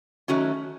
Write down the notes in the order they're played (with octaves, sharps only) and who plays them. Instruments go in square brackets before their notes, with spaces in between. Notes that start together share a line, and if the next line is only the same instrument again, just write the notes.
[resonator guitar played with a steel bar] D#3 F#3 A3 C#4 F#4